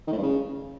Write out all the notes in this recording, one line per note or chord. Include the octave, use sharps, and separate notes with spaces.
D#3
A2
G2
C#3